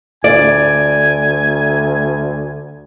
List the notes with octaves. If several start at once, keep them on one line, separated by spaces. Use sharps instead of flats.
D2 D5 G#5